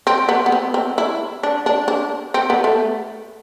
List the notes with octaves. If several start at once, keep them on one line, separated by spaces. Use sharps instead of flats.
C4
B3
B3
C4
C4
E4
D4
D4
D4
C4
B3
A3